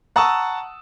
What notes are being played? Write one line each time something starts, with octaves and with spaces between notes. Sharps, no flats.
F#5 A5 A#5 C#6 D#6 E6